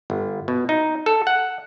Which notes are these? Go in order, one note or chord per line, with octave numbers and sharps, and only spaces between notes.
G1
B2
D#4
A4
F#5